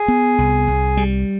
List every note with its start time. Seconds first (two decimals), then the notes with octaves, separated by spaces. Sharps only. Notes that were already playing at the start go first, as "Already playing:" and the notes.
Already playing: G#4
0.08 B3
0.38 C2
0.68 C2
0.97 G3